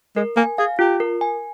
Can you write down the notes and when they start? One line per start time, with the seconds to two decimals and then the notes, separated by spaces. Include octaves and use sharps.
0.16 G#3 A#4
0.37 A#3 G#5
0.58 G#4 F5
0.79 F4 G4
1.00 A#4
1.21 G#5